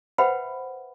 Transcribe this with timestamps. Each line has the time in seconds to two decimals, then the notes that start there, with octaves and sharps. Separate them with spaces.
0.18 B4 C5 E5 F#5 G5 B5